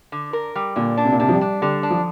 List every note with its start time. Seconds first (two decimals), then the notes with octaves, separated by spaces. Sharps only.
0.12 D3
0.33 A#4
0.55 G3
0.76 A#2 D3
0.97 D4
1.04 C3
1.12 A#2
1.20 C3 D4
1.29 F3
1.33 G3
1.41 D4
1.62 D3 G3
1.83 D4
1.90 F3